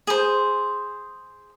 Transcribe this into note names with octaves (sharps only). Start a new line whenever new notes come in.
G#4 C5